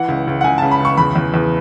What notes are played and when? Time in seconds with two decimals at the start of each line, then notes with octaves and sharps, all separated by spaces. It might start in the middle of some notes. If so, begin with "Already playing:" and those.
Already playing: E3 F#5
0.08 C#2
0.27 C#2
0.41 F#5
0.44 C#2 G#5
0.58 C#3 A5
0.71 B5
0.80 C#2 C#6
0.97 E2 B5
1.16 E2
1.34 E2